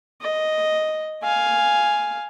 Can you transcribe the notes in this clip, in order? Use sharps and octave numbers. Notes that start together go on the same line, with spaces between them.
D#5
F5 G#5